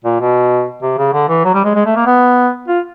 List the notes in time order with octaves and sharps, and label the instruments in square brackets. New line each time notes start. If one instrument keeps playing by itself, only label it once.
[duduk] A#2
B2
C3
C#3
D3
E3
F#3
G3
G#3
G#3
A3
A#3
B3
F4